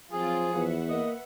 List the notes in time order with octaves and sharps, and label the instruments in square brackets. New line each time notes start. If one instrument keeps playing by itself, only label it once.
[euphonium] F3 [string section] F#3 C4 F4 [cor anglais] G#4
[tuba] E2 [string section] B4 E5 F#5
[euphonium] A#3 [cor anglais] D#5